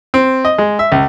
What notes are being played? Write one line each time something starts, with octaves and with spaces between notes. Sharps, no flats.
C4
D#5
G#3
E5
C#2